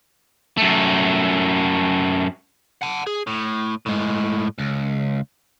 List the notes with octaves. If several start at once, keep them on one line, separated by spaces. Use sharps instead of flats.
F#2 A3
F#5 A5
G#4
A2
A2 G#3
C#2